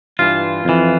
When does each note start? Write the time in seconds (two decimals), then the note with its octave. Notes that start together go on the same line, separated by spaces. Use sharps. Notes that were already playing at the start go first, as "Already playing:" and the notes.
0.19 G2 E3 F4
0.65 F2 E3